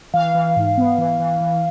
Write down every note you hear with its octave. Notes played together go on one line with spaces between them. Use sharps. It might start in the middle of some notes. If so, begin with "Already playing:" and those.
E3 F5
E3
G#2
B3
E3
E3
E3